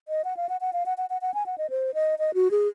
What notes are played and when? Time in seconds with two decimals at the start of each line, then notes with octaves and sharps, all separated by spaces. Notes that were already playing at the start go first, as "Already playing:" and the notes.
0.08 D#5
0.24 F#5
0.37 F5
0.49 F#5
0.61 F#5
0.73 F5
0.86 F#5
0.98 F#5
1.10 F#5
1.22 F#5
1.34 G#5
1.46 F#5
1.58 D#5
1.70 C5
1.94 D#5
2.19 D#5
2.34 F#4
2.51 G#4